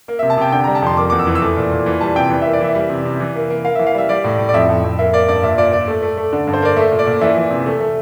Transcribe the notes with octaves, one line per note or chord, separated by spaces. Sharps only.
A#3
E5
C3
A5
C3 G5
D3 G5
A#5
G3
A5
F2 C6
A#3 D6
E2 D6
E6
E3
E6
A3 D6
A#2
A#2
E3
G3 A5
C3 G5
E3
E5
A#3
D5
E3 E5
G3
C3
C3
E3
A#3
A#3
A#3 F5
E5
E3
F5
G3 E5
G3 D5
A2
A2
D5
F2 E5
F2
F2
A#3 E5
A#3 D5
G2 D5
A#2 E5
A#2 D5
A#2 D5
A3
A3
A3
D3
G2
C5
A#3 D5
A3 E5
A#2
D5
A#2
E3 E5
E3
C3
A3
A3